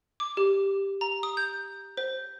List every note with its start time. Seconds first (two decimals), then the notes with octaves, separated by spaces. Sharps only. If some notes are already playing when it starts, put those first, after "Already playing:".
0.20 D6
0.37 G4
1.01 A#5
1.23 D#6
1.37 G6
1.97 C5